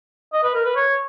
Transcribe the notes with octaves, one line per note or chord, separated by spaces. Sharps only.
D#5
B4
A#4
B4
C#5